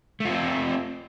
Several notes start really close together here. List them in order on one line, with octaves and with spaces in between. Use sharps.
A3 F4 C4